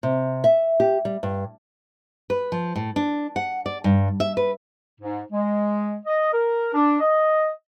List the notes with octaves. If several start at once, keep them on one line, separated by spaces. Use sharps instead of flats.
C3
E5
G4
G3
G2
B4
F3
A2
D4
F#5
D5
G2
E5
B4
G#2
G#3
D#5
A#4
D4
D#5